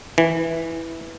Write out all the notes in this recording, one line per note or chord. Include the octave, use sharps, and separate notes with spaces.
E3